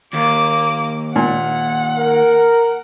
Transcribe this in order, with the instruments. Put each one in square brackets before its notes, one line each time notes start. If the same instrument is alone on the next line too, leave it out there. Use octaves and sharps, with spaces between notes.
[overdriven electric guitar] D#2 [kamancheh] A#3 D6
[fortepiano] A#2 [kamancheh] F#5
[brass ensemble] A#4